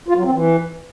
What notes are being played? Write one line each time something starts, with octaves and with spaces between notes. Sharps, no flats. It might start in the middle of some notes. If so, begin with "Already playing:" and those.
F4
F#3
C4
E3